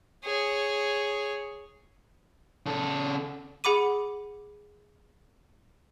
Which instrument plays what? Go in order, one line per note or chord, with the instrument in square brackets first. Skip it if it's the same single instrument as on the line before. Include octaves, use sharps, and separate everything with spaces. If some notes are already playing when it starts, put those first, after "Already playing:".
[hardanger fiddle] G#4 C#5
[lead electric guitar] C#3 A4
[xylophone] G#4 F#5 B5 D6 D#7